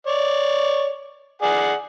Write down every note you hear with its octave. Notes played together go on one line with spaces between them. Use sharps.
C#5 D5
G#4 D5 F#5